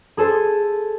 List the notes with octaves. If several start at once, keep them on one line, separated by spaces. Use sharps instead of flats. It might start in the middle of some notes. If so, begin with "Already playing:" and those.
G#4 A4 C5